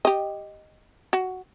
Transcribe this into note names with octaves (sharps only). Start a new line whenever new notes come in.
G4 D#5
F#4